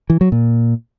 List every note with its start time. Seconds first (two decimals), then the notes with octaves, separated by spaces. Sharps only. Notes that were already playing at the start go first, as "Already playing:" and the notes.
0.10 E3
0.21 F#3
0.32 A#2